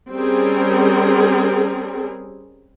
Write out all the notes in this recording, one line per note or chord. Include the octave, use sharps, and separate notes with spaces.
G3 C4 C#4 G#4 A#4